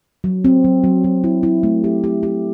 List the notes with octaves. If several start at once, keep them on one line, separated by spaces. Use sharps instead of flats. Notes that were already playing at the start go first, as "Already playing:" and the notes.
F#3
C4
F#3
F#3
F#3
E4
E4
A3
G4
G4
G4